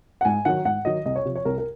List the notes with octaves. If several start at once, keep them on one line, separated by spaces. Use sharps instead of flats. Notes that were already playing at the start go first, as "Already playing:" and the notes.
F#5
G#2 G#5
D#3 F#3 F#5
G#2 F#5
D#3 F#3 D#5
C2 D#5
C#5
C3 F3
C#5
C2 A#4
A#4